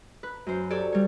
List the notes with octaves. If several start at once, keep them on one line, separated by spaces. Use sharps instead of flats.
B4
F#2 C5
G4 A4 C#5 D5
G3 C#5